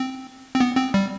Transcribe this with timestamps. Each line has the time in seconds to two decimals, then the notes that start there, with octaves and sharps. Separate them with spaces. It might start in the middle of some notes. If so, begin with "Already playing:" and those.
Already playing: C4
0.55 C4
0.60 B3
0.77 C4
0.94 G3